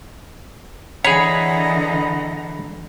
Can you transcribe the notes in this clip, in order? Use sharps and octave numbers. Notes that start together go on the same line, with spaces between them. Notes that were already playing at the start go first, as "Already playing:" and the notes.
D3 E3 G#4 C#5 D#5 F#5 A#5 B5